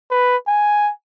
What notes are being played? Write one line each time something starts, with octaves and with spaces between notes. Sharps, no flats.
B4
G#5